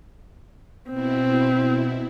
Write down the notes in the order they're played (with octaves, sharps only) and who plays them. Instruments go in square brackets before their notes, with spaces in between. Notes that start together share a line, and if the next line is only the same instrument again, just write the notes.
[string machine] B2 E4 [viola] C4